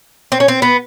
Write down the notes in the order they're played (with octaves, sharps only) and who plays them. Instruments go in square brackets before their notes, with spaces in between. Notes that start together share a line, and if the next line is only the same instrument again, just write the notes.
[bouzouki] C4
C#4
C4
B3